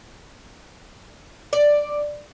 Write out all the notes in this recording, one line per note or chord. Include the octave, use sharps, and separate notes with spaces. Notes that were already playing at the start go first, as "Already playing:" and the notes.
D5